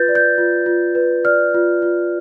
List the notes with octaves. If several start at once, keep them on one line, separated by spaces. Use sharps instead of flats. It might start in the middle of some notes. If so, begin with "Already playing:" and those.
Already playing: F4 B4 G6 A6
D5
G6
F4
F4
B4
D5 F6
F4
F4